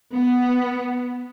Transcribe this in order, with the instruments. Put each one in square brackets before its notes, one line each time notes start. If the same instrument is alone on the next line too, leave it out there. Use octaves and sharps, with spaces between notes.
[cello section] B3